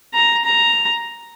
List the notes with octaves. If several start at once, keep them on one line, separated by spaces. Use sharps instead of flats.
A#5
A#5